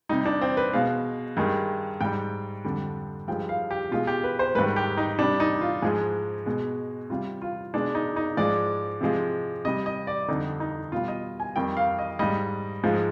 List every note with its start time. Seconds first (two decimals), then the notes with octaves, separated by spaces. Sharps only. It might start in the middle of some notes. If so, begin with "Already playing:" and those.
0.09 C3 G3 D#4
0.25 D4
0.41 C4
0.57 B4
0.73 B2 G#3 F5
1.37 G2 D#3 G#3
2.01 G#2 G3 G5
2.64 F2 D3 G3
3.28 G2 F3 G#3 G5
3.49 F5
3.71 G4
3.91 B2 G#3 F4
4.07 G4
4.24 B4
4.39 C5
4.55 G#2 D#3 G3 B4
4.76 G4
4.97 D#4
5.19 C3 G3 D4
5.40 D#4
5.61 F4
5.82 G#2 F3 G#3 G#4
6.46 B2 G#3
7.10 C3 G3 F4
7.42 F4
7.74 B2 G#3 D4
7.95 D#4
8.16 D#4
8.37 G#2 F3 G#3 D5
9.01 C3 F3 G#3
9.65 C3 G3 D#5
9.86 D#5
10.07 D5
10.28 F2 D3 G3 D#4
10.60 D#4
10.92 B2 G3 F4
11.08 D#5
11.40 G#5
11.56 F2 D#3 G3 G5
11.77 F5
11.98 D#5
12.19 G#2 G3 D#5
12.83 G#2 F3 G#3